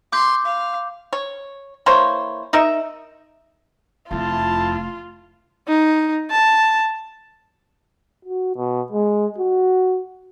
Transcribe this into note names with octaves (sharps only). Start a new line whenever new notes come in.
C6 D6 G6
F5
C#5
E3 A#3 C5 C#5
D#4 A#4 D#5 E5
F1 F2 A3 E4 F4 A5
D#4
A5
F#4
B2
G#3
F#4